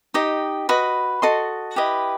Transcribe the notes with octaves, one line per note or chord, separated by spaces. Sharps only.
D#4 G4 D#5
F#4 B4 D#5 B5
F#4 A4 D#5 C6
E4 G4 B4 D#5